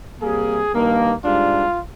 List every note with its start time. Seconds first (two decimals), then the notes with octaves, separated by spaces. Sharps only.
0.21 C3 G3 A#3 G#4
0.73 G2 D#3 A#3
1.23 G#2 G3 D4 F4